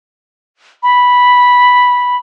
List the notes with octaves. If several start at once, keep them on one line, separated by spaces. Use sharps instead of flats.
B5